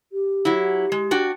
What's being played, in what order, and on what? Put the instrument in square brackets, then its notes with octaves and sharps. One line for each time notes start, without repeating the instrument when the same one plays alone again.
[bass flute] G4
[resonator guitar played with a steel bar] F#3 E4
G#3
D4 F#4 G5